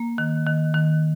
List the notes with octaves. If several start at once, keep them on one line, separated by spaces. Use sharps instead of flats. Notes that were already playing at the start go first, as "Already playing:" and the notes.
Already playing: A#3
D#3
D#3
D#3